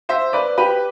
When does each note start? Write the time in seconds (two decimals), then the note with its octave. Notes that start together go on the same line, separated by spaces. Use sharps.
0.09 C5 E5
0.33 B4 D5
0.57 G4 B4